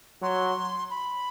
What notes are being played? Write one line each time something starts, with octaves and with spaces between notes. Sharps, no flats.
F#3 C6
B5